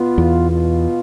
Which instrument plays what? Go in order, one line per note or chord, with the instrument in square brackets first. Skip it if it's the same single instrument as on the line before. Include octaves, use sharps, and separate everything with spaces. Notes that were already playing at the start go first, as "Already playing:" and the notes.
Already playing: [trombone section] B2 B3 F4
[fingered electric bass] E2
[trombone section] B2 B3 F4